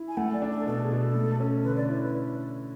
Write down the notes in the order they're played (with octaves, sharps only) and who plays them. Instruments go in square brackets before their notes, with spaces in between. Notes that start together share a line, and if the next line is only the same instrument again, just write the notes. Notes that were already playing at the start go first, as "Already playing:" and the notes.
Already playing: [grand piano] E4
[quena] G#5
[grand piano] A3 [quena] F#5
[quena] D5
[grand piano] D4
[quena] A4
[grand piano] B2 [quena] A4
[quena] G#4
[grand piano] B2
[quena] A4
[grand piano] A3
C#4
[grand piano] D3 [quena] B4
[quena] D5
[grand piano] E4 [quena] D5
[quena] B4